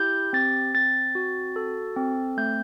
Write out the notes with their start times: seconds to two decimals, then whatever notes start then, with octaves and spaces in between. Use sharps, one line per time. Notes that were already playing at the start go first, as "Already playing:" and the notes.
Already playing: E4 G4 G6
0.33 C4 A6
0.75 C4 A6
1.15 F#4
1.56 A4
1.97 C4
2.37 A3 G6